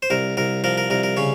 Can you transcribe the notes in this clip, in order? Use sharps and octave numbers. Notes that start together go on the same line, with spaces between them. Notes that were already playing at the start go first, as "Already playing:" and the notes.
C5
C2 A#4
C2 A#4
F3 A#4
A#4
C2 A#4
A#4
C#3 C#5